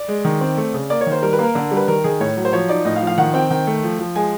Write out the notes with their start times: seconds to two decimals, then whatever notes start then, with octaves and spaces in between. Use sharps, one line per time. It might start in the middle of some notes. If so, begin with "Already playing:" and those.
Already playing: D5
0.08 G#3
0.25 D#3
0.41 C4
0.57 A3
0.74 C#3
0.90 A#3 D5
1.01 C#5
1.06 D#3
1.12 C5
1.22 G3 A#4
1.33 B4
1.39 A#3 A#4
1.55 D3
1.71 G3
1.77 B4
1.88 D#3 A#4
2.04 D#3 G#4
2.20 A2 C#5
2.36 F#3
2.45 C5
2.53 F3 C#5
2.69 D#4 D5
2.85 A2 D#5
2.96 F5
3.01 F3
3.07 F5
3.18 D#3 F#5
3.34 C4 G5
3.50 D#3 G5
3.67 A3
3.83 F3
3.99 F3
4.16 G#3 G#5